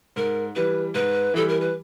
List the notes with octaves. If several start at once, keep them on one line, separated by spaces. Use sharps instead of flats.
G#2 A#4
E3 G3 B4
G#2 B4
E3 G3 A4
A#4
B4